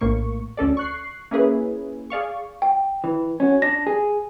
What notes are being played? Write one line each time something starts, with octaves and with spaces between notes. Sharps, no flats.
A#1 A2 A#3 C#6
D2 C#4 A4 D5
C#6 F#6 C7
A#3 C#4 E4 G#4 B4
G#4 D5 F5 C#6
G5
E3
C#4 F#4
D4 A#6
G#4